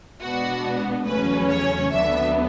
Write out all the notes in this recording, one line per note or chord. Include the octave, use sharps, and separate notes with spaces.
B2 G#3 B3 D4 F#4
E2 C#3 F#3 A3 C#4 B4
C#5
D2 D3 F#3 B3 D4 E5